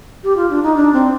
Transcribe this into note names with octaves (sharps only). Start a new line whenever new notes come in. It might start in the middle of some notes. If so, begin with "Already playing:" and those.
G4
F4
D4
D#4
D4
C4